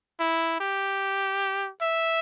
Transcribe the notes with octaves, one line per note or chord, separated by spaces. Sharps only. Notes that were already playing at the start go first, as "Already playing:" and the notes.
E4
G4
E5